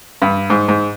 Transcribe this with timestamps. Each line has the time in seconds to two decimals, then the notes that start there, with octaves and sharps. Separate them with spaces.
0.22 G2
0.50 G#2
0.68 G#2